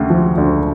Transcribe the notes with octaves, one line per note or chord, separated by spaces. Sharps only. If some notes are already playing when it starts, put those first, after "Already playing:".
Already playing: D2 C#3 A3 G4
F3
D2